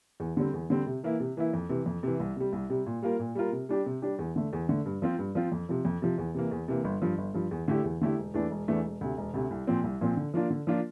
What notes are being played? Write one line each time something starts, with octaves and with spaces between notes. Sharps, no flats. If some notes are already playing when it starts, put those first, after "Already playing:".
E2
D3 G3 C4
E2
D3 G3 C4
C3
E3 A#3 E4
C3
E3 A#3 E4
F2
C3 E3
F2
C3 E3
C2
C3 G3
C2
C3 G3
A#2
G3 A#3 F4 A#4
A#2
G3 A#3 F4 A#4
C3
G3 D4 G4
C3
G3 D4 G4
E2
D3 A3
E2
D3 A3
G2
F3 C4 F4
G2
F3 C4 F4
F2
C3 F3
F2
C3 F3
E2
C3 E3 A#3
E2
C3 E3 A#3
G1
G2 F3
G1
G2 F3
E2
D3 A3 E4 G4
E2
D3 A3 E4 G4
E1
E2 E3 A3 D4
E1
E2 E3 A3 D4
E1
D2 C3
E1
D2 C3
C2
A#2 F3 C4
C2
A#2 F3 C4
D3
F3 A#3 D4 F4
D3
F3 A#3 D4 F4